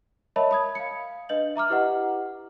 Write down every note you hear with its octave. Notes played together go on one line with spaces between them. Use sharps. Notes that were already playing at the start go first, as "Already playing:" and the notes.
A#4 C#5 D#5 E5 A5 B5
B5 D#6 G#6
F5 C#7
D4 B4 D#5 G6 F#7
E5 A#5 D6 F6
E4 G4 B4 D#5 F#5